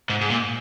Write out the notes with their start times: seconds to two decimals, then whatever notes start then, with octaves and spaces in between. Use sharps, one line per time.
0.09 G#2
0.21 G#2
0.30 A#2